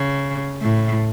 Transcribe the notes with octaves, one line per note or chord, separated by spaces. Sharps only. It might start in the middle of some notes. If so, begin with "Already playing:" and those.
Already playing: C#3
A2